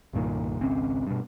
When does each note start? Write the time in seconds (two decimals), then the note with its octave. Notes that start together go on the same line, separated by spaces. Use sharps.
0.13 C2 G2 A#2 D#3
0.61 G#1 C#2 C4 C#4
1.07 G2 B2